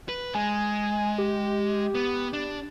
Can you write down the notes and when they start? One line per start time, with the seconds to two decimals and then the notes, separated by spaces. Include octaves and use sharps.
0.09 B4
0.35 G#3 G#5
1.18 G4
1.95 B3
2.33 D4